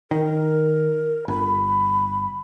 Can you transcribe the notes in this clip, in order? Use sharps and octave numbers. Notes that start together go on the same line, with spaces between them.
D#3 A#4
G1 B5